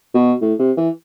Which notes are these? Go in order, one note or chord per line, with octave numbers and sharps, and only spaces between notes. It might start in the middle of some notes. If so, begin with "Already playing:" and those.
B2
A2
C3
E3